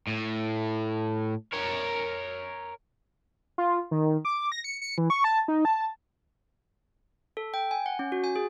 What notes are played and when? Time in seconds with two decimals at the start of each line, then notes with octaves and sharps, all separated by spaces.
0.08 A2
1.53 A#4 C#5
3.58 F4
3.91 D#3
4.25 D6
4.52 A#6
4.64 C#7
4.81 C#7
4.98 E3
5.10 C#6
5.24 A5
5.48 D#4
5.65 A5
7.37 A4
7.54 G5
7.71 G#5
7.86 F#5
7.99 C#4
8.12 F#4
8.24 G#5
8.36 G#4